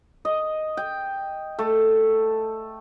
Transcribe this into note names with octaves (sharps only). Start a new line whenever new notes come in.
D#5
G5
A3